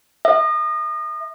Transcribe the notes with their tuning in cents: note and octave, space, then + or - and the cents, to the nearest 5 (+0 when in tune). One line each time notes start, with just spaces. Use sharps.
E5 +0 D#6 -35